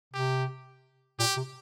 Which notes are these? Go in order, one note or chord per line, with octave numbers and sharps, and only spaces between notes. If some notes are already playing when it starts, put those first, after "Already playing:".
C3 G4
A#2 G4
C3